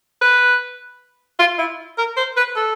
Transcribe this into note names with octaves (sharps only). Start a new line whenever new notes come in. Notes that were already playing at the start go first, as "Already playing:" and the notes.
B4
F4
E4
A#4
C5
B4
A4